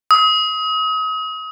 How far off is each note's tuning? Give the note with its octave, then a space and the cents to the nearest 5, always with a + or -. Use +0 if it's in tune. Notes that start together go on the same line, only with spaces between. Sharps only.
D#6 +35